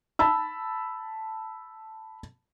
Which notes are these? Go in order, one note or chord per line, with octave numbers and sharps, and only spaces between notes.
A5 B5 E6